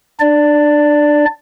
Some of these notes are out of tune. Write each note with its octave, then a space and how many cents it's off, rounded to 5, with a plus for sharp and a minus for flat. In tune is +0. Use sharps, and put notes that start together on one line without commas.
D4 +25 D5 +0